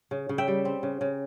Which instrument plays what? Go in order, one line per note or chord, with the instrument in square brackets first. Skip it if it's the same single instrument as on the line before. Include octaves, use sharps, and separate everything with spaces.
[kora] C#3
C#3
E5 G5
G3
C4
C#3
C#3